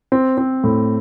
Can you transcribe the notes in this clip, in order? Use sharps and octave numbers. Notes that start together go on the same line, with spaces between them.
C4
C4
A2